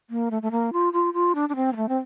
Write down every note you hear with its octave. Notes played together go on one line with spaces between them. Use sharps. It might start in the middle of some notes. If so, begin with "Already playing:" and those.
A#3
A3
A3
A#3
F4
F4
F4
D4
D4
C4
A#3
A3
C4